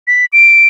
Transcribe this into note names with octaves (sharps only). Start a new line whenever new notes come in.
B6
D7